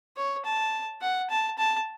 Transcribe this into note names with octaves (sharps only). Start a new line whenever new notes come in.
C#5
A5
F#5
A5
A5